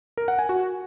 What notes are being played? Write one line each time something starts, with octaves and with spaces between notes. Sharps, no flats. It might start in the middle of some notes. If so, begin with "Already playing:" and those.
A#4
F#5
G#5
F#4